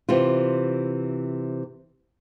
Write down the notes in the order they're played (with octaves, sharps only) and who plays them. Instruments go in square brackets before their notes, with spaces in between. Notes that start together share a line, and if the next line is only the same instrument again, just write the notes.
[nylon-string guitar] C3 E3 F4